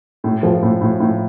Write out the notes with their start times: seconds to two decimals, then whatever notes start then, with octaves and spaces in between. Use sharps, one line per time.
0.24 A2
0.43 F3
0.62 A2
0.81 A2
1.00 A2